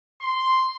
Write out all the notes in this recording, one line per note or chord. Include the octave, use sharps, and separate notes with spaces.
C6